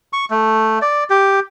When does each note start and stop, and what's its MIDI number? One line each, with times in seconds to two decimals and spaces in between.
0.13 0.25 85
0.30 0.79 57
0.82 1.04 74
1.10 1.40 67